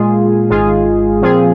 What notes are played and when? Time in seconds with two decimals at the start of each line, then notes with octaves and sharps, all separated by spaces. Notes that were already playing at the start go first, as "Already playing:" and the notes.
Already playing: A#2 G#3 F4 G#4
0.50 G#1 G#2 G#3 F4 G#4
1.21 A#2 F3 C4 F4 G#4